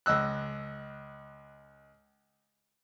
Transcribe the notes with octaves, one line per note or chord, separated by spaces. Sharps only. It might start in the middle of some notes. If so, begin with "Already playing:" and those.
C#2 D#5 E6 F#6